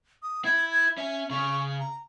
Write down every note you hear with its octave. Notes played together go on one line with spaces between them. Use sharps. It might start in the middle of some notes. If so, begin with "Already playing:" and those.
D#6
E4 G#6
G#6
C#4 E5
C#3 C#4 C#6
A#5